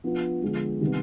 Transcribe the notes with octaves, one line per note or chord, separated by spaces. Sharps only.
F3 B3 D4 F4
D3 F3 G#3 B3
C3 D#3 G3 B3